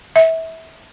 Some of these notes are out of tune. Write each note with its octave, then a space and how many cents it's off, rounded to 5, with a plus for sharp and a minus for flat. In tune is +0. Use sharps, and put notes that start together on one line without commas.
E5 -25